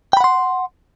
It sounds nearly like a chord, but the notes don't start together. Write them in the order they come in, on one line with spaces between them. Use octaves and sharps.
G5 B5 F#5 C6